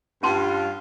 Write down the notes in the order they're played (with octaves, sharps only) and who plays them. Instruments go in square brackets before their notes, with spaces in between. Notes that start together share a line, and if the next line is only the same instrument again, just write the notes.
[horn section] G2 F4 [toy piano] C#4 A5 C6